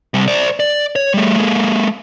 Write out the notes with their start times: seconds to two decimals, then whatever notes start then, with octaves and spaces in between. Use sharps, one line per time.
0.14 C3 G3
0.28 C5 D5
0.60 D5
0.96 C#5
1.14 G3 A3
1.38 G#3 A#3